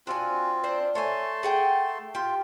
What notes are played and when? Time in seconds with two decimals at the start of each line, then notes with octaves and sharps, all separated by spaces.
0.07 C4 D4 F4 F#4 G#5
0.64 D4 C5
0.95 A3 C#5 G#5 A5 C6
1.43 G#4 F#5 G5
2.15 F4 G4